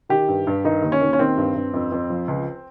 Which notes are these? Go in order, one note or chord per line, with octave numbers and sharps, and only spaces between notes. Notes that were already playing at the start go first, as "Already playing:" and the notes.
D#3 G4
G2
G2
D#3 D#4
D#2
C#4
D#2
C#4
D#3 C4
G2
G2
F2
F2
F3
C#2